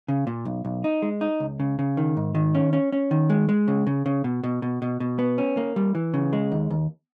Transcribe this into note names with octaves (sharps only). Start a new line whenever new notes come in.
C#3
A#2
B1
B1
D#4
G#3
D#4
C#2
C#3
C#3
D#3
G#2
D#3
C#4
C#4
C#4
D#3
G#3
G#3
C#3
C#3
C#3
B2
B2
B2
B2
B2
B3
C#4
A#3
G3
E3
C#3
G#3
D#2
D#2